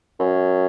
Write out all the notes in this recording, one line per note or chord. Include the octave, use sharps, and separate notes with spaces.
F#2